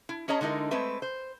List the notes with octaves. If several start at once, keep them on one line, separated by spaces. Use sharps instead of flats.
E4
C#4 G#4 C#5 D#5 A#5
D3 G#3 D#4 E4 A#4
G#3 A3 C4 B4 E5
C5